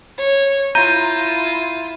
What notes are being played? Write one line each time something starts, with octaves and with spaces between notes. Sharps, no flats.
C#5
E4 F4 A#5 G6 D#7